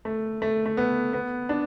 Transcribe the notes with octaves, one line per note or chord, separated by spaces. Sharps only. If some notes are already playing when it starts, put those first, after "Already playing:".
A3
A3
A3
B3
B3
D4